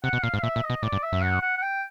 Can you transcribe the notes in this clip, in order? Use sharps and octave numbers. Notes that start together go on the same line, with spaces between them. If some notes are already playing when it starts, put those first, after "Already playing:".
C3 F#5
B2
A#2 F5
G#2
F5
A#2 E5
A#2
D#5
B2
A2 D5
G2
E5
F#2
F#5
F#5
F#5
G5